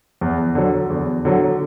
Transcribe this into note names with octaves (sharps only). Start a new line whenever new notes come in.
E2
D3 F#3
E2
D3 F#3